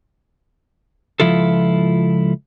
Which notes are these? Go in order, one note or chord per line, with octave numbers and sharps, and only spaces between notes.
C#2 C3 F3 E4 F4 A4